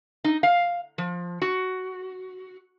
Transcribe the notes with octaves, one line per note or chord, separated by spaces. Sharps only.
D#4
F5
F3
F#4